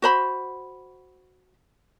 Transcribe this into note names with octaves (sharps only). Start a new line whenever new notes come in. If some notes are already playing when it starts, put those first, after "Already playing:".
F#4 C5 B5